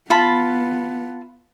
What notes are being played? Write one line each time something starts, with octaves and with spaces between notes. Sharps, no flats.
B3 F4 A5 B5